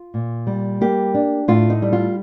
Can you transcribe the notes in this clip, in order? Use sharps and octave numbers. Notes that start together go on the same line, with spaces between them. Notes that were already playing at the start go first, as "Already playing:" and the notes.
Already playing: F4
A#2
G3
A#3 G4
D4
A2 F4
D#4
G3
F4